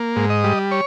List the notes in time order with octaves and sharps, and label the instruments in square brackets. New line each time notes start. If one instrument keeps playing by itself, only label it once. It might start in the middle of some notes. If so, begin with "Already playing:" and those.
Already playing: [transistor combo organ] A#3
G#2
D#5
G3
C#5